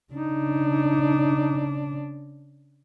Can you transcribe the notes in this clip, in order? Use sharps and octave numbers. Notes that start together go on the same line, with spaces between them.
C#3 D4 D#4